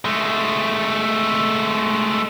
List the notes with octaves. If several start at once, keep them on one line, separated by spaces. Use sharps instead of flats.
G#3 A3